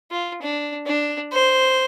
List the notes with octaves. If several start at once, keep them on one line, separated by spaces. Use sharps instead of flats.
F4
D4
D4
C5